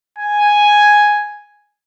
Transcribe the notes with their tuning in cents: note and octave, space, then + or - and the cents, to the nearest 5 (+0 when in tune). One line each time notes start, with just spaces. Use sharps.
G#5 +0